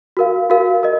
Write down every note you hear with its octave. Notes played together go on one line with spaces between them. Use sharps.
F#4 A#4 F5
F#4 A#4 F5
A#4 D#5